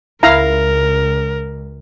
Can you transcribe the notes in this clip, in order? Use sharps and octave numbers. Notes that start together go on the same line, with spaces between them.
C#2 E4 A#4 F5 A#5